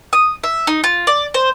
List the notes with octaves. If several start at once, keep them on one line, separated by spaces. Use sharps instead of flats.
D#6
E5
D#4
F4
D5
C5